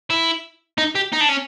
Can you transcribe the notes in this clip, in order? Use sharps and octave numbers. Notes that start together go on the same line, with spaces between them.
E4
D#4
G4
D#4
D4
C#4